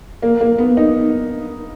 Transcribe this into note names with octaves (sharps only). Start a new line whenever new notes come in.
A#3
A#3
B3
D#4